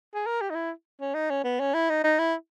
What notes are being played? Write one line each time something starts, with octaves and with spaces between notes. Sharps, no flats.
G#4
A#4
G4
D#4
E4
C#4
D#4
C#4
B3
C#4
E4
D#4
D#4
E4